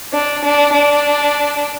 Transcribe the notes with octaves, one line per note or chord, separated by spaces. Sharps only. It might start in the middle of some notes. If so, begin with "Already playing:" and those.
D4
D4
D4